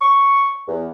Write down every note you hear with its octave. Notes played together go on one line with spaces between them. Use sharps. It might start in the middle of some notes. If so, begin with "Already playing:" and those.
C#6
E2